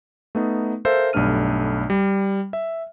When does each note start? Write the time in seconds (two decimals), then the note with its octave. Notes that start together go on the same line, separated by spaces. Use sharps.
0.35 A3 B3 D#4
0.85 A4 A#4 C5 E5 F5
1.13 B1 G2 A3 D4 F6 D#7
1.90 G3
2.53 E5